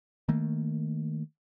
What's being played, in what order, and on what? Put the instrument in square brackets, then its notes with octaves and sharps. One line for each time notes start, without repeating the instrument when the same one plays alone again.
[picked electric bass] D#3 A3 A#3